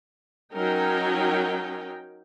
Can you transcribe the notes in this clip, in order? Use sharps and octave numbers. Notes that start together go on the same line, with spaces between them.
F#3 C#4 D#4 A#4 G5